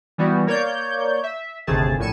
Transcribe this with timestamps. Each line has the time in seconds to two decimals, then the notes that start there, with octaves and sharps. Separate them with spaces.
0.18 E3 G3 B3 F#4
0.47 A#3 C#5 D5 G6
1.24 E5
1.67 G1 D#2 C3 A3 G#4 A5
1.98 A#1 A2 G#5 C#7 E7